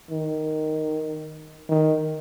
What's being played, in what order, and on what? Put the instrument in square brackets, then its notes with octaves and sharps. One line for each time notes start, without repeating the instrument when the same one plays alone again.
[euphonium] D#3
D#3